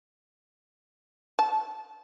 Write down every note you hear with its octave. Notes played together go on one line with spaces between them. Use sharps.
A5